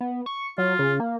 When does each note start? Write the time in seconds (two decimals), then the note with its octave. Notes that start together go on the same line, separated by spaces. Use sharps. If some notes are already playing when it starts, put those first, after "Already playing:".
0.01 B3
0.26 C#6
0.58 F#3 F4
0.79 C#3
1.00 A#3